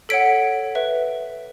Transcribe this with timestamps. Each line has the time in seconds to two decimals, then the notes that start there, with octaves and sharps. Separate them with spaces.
0.09 A4 C#5 F#5 B6 D7
0.75 B4 E5